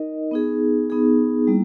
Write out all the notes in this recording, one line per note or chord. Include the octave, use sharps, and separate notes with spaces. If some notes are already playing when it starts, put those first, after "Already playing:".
Already playing: D#4 A#4 D#5
B3 D#4 G#4
B3 D#4 G#4
G3 A#3 E4